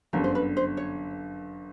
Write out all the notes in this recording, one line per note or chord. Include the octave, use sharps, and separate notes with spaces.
G1 F#2 D3 A#4
C5
B4
C5
C#5